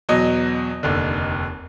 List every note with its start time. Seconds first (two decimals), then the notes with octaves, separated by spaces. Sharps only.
0.09 E2 B2 F#3 D#5
0.83 F1 D#2 D3